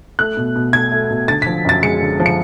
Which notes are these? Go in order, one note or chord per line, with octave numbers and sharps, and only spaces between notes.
A3 F#6
B2
B2
A3 G#6
A3
B2
D3 A6
B6
F3
F#2 A6
G#3 C#7
D3
F3
C#7